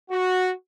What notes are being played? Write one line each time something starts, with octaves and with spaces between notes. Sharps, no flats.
F#4